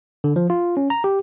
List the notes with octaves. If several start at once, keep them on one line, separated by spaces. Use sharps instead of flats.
D3
F3
F4
C#4
A#5
G4